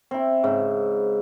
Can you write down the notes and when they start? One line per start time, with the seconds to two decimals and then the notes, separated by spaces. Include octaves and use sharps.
0.11 C4 E4
0.44 G#2 C#3